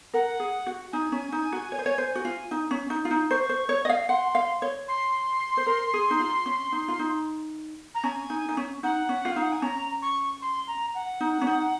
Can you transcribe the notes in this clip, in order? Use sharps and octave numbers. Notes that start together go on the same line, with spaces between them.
A#4 F#5
G#4
F#4
D#4 G#5
C#4
D#4
F#4
C#5
C5
C#5
C5
F#4
F4
D#4
C#4
D#4
F4
D#4
C5 C#6
C5
C#5
D#5
F5
F#5 C6
F5
C#5
C6
C5
A#4
G#4
D#4
F4
C#4
D#4
F4
D#4
A#5
C#4 G#5
D#4
D#4
C#4
D#4 F#5
C#4
F4
F5
D#4
F#5
G#5
C#4 A#5
C#6
C6
A#5
F#5
D#4
C#4
D#4